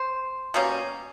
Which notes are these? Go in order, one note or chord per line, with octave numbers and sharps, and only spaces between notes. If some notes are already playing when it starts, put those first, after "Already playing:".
Already playing: C5
B2 G3 A#3 C#4